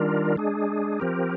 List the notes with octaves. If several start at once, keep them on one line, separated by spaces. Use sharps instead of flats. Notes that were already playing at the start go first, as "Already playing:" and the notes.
Already playing: D#3 G3 D4 F4 A#4
G#3 D4 G#4
F3 C4 G4 A#4